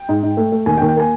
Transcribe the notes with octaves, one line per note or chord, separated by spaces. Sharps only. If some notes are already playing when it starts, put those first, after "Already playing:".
Already playing: G5
G#2
G#2
A3
A3
D#2 G#5
G5
D#2
G5
A#3 G#5